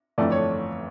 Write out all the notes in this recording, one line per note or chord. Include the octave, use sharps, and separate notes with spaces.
G1 F2 E3 A3 D5
C#5